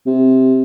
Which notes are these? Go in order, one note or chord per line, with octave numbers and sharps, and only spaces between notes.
C3